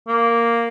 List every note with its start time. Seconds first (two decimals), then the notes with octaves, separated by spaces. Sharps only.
0.08 A#3